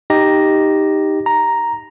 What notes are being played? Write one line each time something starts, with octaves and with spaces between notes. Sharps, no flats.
D#4 G4 A#6
A#5